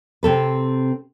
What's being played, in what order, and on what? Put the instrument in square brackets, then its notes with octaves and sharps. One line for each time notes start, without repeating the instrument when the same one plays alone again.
[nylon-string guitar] C3 C4 A4 B4